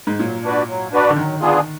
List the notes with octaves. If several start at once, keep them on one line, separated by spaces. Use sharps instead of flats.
G#2
A#2 F#3
D4 F#4 B4 D5
F#3
D4 F#4 B4 D5
D3
D#3 F#3
B3 D4 F4 G#4